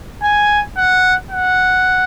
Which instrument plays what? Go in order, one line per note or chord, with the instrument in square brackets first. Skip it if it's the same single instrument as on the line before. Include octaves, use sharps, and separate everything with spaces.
[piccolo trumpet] G#5
F#5
F#5